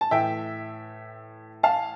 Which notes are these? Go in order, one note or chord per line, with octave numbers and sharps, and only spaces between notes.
A5
A2 E3 E5 G5
F5 A5